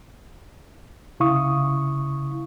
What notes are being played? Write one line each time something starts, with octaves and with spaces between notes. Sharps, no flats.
C2 C#3 E4 F5 C#6 D#6